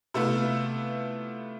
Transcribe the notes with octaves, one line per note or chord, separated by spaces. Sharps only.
C3 A3 B3 E4 F4